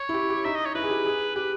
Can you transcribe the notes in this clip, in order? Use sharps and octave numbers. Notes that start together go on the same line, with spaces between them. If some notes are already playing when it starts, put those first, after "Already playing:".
Already playing: C#5
E4
G4
G4
D#4 E5
D#5
C#5
E4 B4
G#4
G4
G#4
G4 B4